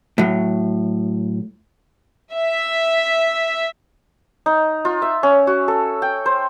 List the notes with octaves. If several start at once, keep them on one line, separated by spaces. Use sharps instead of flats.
A2 F#3
E5
D#4
F4
E5
C#4
F#4
A4
G5
C5